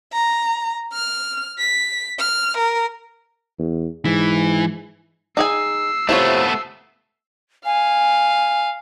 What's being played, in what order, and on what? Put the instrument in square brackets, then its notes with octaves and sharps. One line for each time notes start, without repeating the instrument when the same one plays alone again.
[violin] A#5
F6
B6
F6
A#4
[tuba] E2
[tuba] G#2 [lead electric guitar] E3
[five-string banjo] D#4 G#4 G#5 [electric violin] E6 C7
[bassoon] C3 [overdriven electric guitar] A3 B3 [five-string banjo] E4 F4 C#5
[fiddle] F5 [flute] G#5